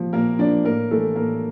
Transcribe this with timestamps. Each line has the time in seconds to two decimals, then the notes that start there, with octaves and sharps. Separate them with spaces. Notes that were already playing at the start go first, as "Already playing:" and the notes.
Already playing: A#2 F3
0.13 A#2 A#3 A#4
0.39 F3 D4 D5
0.64 A2 A#3 A#4
0.91 E3 A3 A4
1.16 A2 A#3 A#4